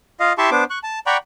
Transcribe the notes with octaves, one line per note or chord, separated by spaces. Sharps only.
F4 D#5 F5
E4 G4 E5 A5 C6 C#6
B3 D4 C5 D6
C#6 F#6
A5
D5 F#5 G5 A#5 B5 C#6